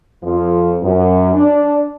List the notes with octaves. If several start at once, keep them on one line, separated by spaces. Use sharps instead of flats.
F2 F3
F#2
D4